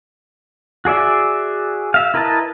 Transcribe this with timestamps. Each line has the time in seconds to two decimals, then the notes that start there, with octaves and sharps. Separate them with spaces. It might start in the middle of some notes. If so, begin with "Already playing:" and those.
0.85 F#4 G#4 D5 E5
1.94 E5 F5
2.14 E4 A#4 B4 D#5 A5